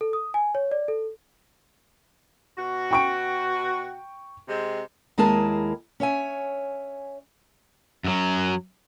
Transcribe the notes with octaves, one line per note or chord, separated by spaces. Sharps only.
A4
D#6
G#5
C#5
D5
A4
B2 F#4
G5 C#6 D7
C3 G#3 C4
D#2 G#3 E4 G#4 A#4 A5
C#4 C#5 E5 G#5
F#2 F#3